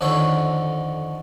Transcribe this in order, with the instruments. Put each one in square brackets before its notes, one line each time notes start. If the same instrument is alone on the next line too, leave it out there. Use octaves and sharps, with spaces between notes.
[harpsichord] F2 D3 D#3 A4 C#5